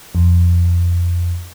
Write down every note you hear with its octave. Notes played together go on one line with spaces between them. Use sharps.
F2